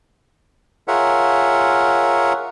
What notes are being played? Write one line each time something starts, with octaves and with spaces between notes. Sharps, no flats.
F4 G#4 A#4 C#5 E5 F#5